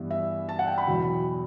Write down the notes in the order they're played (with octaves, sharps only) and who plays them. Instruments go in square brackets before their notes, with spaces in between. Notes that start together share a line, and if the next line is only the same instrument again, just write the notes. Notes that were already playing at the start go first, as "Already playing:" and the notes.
Already playing: [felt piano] G2 E3 G3 B3
E5
A5
F#5
G5
B5
E2 B2 F#3